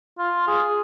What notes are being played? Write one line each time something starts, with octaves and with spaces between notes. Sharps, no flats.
F4
G#4